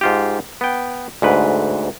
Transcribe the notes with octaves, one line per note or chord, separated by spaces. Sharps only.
G#2 F4 G4
B3 G5
D2 G#2 B4